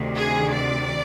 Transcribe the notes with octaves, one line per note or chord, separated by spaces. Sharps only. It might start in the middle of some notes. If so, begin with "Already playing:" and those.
Already playing: D2 C3 D#3
G#4
D5